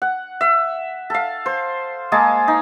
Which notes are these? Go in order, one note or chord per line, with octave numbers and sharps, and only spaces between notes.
F#5
E5
A4 F5
C5
G#3 A#3 G#4 A5
D#4